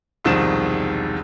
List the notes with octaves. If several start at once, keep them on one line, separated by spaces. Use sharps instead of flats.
E1 C2 D#3 F3 E7